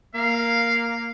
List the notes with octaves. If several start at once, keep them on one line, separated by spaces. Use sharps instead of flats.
A#3 F5